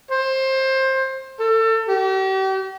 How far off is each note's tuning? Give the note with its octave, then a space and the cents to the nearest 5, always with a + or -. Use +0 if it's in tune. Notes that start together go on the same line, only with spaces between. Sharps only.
C5 +20
A4 +30
G4 -40